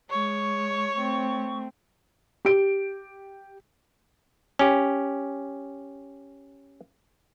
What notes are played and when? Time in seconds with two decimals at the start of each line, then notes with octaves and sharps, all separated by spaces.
0.10 G#3 C#5 C#6
0.95 A3 C4
2.45 G4 D7
4.59 C#4 G4